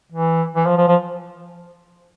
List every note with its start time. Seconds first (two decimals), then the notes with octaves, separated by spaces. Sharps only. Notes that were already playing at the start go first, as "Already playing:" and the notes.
0.12 E3
0.56 E3
0.66 F3
0.77 F3
0.88 F3